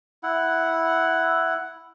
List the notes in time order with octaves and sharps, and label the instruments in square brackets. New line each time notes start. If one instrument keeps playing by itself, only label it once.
[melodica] E4 F#5